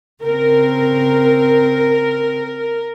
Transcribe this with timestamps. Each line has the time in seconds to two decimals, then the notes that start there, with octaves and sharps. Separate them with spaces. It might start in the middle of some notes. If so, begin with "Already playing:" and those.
0.23 C#3 C4 A#4